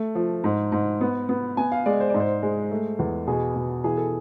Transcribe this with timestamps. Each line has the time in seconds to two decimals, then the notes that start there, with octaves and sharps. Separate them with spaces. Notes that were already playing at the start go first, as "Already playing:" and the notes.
Already playing: A3
0.15 F3
0.44 G#2
0.72 G#2
1.01 B3
1.29 B3
1.57 B3 G#5
1.72 F5
1.86 G#3 D5
2.00 C5
2.10 G#2 D5
2.20 C5
2.43 G#3
2.71 A3
2.99 E2
3.27 B2 G#4
3.56 B2
3.84 E3 G#4
3.97 A4